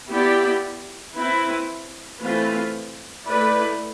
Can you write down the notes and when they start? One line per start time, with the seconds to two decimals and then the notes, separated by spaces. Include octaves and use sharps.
0.08 B3 E4 G4 D5
1.15 C4 E4 B4
2.19 E3 A3 C4 F4 B4
3.25 A3 E4 B4 D5